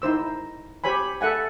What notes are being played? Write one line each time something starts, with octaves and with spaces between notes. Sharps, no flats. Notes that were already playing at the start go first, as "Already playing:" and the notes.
D#4 E4 C5 E6
G4 C5 C#5 G#5 B5
A4 E5 F#5 G#5